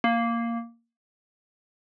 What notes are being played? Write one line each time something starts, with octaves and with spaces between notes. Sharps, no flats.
A#3